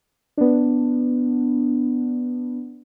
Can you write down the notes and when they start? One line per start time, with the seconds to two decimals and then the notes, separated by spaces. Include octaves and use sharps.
0.37 B3 D4